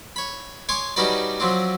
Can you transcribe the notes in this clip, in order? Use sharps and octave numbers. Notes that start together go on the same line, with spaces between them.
C#5 B5
C#5 G#5 C6 D6 D#6
G3 C#4 D#4 F#4 B4 D5
F3 F#3 C4 D4